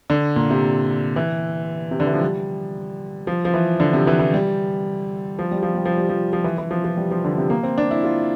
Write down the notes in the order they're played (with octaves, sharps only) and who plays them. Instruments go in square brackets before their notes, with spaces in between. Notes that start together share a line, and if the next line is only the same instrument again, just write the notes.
[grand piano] D3
A#2
C3
E3
C3
D3
E3
F3
G3
F3
F3
E3
D3
C3
E3
E3
G3
F3
G3
F3
G3
F3
G3
F3
F3
E3
E3
F3
F3
G3
F3
D3
C3
A#3
C4
D4
E4
F4